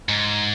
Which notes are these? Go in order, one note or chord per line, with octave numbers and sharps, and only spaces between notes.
G#2